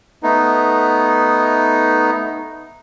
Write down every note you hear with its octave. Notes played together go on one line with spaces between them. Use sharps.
A3 B3 D#4